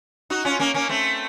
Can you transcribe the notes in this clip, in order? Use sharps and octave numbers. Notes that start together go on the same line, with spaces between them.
D#4 F#4
C#4 F4
A#3 C#4
A#3 C#4
A3 C4